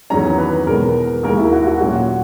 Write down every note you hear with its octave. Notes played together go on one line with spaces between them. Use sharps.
E2 D#3 F#3 C#4 A#5
B4
E2 B2 G#3 B3 A#4
D#2 D#3 G#3 A#4
E4
F#4
F#4
A#2 F#3 C#4 F#4